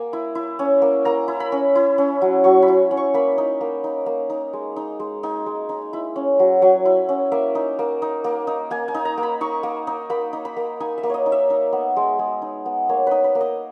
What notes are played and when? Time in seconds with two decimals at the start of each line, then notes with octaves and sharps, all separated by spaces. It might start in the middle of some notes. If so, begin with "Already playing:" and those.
Already playing: A#3 G#5 A#5
0.13 E4
0.35 E4
0.59 C#4
0.82 A#3
1.05 A#3 A#5
1.28 E4
1.40 B5
1.52 C#4
1.75 E4
1.98 C#4
2.22 F#3
2.44 F#3 C#6
2.62 B5
2.68 E4
2.91 C#4
2.97 C#6
3.14 A#3 B5
3.38 D#4
3.61 A#3
3.84 D#4
4.06 A#3
4.30 D#4
4.53 G#3
4.76 D#4
5.00 G#3
5.23 D#4 G#5
5.46 G#3
5.69 D#4
5.93 E4
6.16 C#4
6.39 F#3
6.62 F#3 G#5
6.85 E4
7.09 C#4
7.32 A#3 E5
7.55 D#4
7.79 A#3
8.02 D#4
8.24 A#3
8.47 D#4
8.71 A#3 G#5
8.88 G#5
8.94 D#4
9.05 A#5
9.18 A#3
9.23 B5
9.41 D#4 C#6
9.63 A#3
9.87 D#4
10.10 A#3 B5
10.33 D#4
10.45 B5
10.57 A#3
10.80 D#4 G#5
10.98 E5
11.03 A#3
11.10 C#5 D#5
11.26 D#4
11.32 E5
11.50 D#4
11.73 B3
11.96 G#3
12.19 G#3
12.42 D#4
12.66 B3
12.89 A#3 C#5
13.07 D#4 B4
13.24 B4
13.35 A#3
13.41 D#5